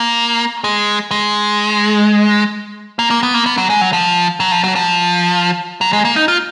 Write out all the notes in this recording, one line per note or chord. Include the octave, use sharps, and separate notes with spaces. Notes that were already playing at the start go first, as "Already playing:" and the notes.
Already playing: A#3
G#3
G#3
A#3
A#3
B3
A#3
B3
F#3
G#3
F#3
F3
F#3
F3
F#3
F3
F#3
G#3
A#3
D#4
F4